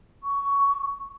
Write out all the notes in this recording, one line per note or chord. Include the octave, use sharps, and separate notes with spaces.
C#6